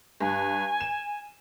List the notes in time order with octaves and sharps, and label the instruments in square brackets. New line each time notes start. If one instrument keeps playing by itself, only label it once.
[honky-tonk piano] G2 [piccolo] G#5
[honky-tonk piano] E7